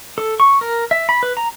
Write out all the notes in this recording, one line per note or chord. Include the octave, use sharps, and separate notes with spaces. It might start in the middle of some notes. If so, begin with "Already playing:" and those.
A4
C#6
A#4
E5
B5
B4
A#5